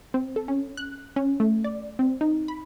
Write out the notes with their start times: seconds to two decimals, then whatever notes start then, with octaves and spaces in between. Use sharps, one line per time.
0.14 C4
0.36 A4
0.48 C#4
0.77 F#6
1.16 C#4
1.40 A3
1.64 D5
1.99 C4
2.21 D#4
2.48 B5